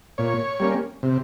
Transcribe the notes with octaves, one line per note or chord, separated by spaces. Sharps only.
A#2 C#5
G3 A#3 C#4
C3